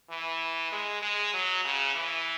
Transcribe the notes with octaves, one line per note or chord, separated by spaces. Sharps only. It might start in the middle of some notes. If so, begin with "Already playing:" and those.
E3
G#3
G#3
F#3
C#3
E3